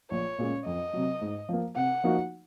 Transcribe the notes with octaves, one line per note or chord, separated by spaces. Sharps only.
A#1 C#5
A#2 G#3 C#4
F2 D#5
C3 F#3
G#2
F3 A#3
C3 F#5
F3 A#3 D#4 F#4